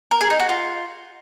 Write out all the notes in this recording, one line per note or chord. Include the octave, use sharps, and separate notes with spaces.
A#4
G#4
D#4
F#4
F4